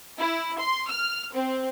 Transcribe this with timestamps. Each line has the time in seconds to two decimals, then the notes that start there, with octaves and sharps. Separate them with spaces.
0.18 E4
0.60 C6
0.89 F6
1.33 C4